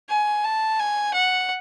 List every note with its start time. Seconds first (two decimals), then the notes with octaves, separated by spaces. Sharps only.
0.09 G#5
0.44 A5
0.79 G#5
1.13 F#5